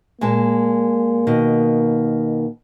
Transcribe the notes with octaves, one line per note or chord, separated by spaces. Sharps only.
A#2 G#3 A#3 A5
B2 D#3